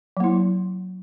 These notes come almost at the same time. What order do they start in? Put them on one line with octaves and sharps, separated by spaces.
F#3 A#3 E4